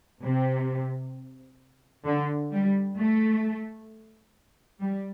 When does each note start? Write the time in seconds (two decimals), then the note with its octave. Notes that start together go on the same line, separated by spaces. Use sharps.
0.23 C3
2.07 D3
2.52 G3
2.98 A3
4.82 G3